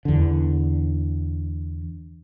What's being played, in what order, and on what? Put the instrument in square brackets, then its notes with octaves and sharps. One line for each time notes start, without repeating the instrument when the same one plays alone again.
[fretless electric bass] E2 D3